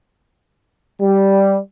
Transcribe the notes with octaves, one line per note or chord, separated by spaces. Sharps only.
G3